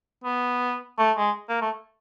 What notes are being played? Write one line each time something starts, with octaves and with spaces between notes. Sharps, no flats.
B3
A3
G#3
A#3
A3